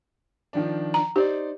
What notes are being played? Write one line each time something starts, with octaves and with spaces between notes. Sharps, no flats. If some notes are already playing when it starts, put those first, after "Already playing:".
D#3 F3 D4
A#5
D#4 G4 C5 D5